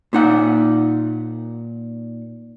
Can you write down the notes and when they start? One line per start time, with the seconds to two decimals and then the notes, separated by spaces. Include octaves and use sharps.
0.13 A#2 D#4 F#5